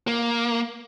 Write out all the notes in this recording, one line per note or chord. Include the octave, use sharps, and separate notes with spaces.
A#3